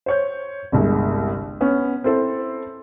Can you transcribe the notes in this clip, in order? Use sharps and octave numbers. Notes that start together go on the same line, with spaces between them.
C5 C#5 G6
G1 C2 G#3
B3 C#4
C4 E4 A4 C5